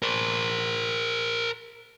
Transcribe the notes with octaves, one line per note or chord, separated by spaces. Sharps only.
A#4 C5